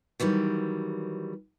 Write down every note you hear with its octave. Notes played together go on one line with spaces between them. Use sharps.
D#3 E3 F#3 G3